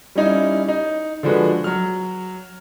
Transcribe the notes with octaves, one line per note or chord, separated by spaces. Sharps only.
G3 C#4 D#4 E4
D#4
D3 F3 G#3 F#4 B4
F#3 F6